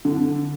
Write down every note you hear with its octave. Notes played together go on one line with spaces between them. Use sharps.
D3